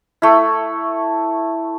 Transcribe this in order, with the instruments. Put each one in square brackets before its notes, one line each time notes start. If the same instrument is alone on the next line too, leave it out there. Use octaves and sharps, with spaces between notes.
[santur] A3 E4